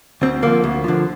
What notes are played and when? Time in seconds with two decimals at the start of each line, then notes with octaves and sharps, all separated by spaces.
0.22 D2 C4
0.42 D3 F3 A#3
0.64 D2
0.84 D3 F3